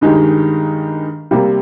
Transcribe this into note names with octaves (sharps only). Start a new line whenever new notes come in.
G2 D#3 G#3 D#4 G4
C3 G3 A#3